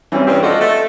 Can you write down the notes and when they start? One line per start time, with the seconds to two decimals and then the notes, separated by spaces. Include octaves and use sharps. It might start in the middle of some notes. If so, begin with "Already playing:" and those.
0.12 E3 G3 C4 C#4
0.27 G2 C4 G4
0.43 F3 F4 F#4 A4 D5 D#5
0.60 A3